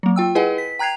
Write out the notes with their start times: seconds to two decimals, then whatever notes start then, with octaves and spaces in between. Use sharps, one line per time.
0.03 F#3 A#3
0.16 F4 G5 E6
0.35 E4 G#4 B4 D#5 F#5 G#5
0.58 B6
0.79 G5 A#5 F#6 G#6 C7 F7